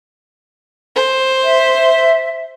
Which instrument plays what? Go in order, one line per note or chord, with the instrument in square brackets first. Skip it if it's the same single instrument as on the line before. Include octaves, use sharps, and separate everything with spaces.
[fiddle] C5
[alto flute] E5